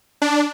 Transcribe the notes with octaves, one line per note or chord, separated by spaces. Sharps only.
D4